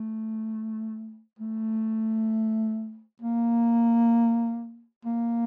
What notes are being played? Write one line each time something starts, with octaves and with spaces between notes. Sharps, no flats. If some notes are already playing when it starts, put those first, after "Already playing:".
Already playing: A3
A3
A#3
A#3